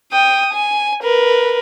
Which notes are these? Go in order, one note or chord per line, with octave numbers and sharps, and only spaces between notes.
G5 D#6
G#5
A#4 B4